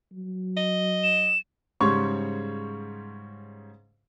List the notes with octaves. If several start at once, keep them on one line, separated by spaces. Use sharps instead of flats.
F#3
D#5
E7
G#2 C#3 G3 C#5 C6 C#6